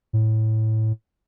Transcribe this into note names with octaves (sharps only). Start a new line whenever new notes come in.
A2